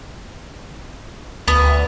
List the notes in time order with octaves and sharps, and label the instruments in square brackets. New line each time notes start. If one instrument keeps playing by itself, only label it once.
[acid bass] D2 [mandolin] B3